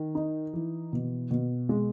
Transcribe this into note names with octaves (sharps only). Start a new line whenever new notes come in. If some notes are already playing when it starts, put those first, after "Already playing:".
Already playing: D#3
D#4
E3
B2
B2
G#3